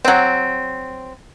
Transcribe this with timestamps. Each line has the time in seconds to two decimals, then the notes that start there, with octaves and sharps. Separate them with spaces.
0.05 F#3 C4